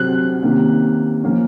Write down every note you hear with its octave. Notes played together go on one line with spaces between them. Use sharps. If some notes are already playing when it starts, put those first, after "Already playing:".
Already playing: C3 F#3 C4 F#6
C3 D#3 A#3 C#4
F3 A#3 C#4